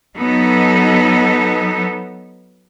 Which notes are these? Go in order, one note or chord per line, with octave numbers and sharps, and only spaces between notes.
F#3 B3 D#4 A4